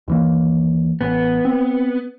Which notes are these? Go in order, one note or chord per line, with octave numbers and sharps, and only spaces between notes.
D#2 E3 A#3
A1 B3
C4